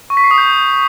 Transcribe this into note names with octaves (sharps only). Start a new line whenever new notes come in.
C#6
B6
C7
D#6
G6